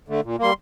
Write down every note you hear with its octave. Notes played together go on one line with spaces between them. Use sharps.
D3 A3
A#2
G3 A#3 C6